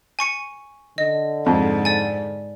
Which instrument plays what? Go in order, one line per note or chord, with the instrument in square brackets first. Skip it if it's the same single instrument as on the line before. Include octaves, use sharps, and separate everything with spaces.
[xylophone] G#5 C#6 C#7
[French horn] D3 [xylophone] D#5
[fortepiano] F2 [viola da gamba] G#2
[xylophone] D5 G#5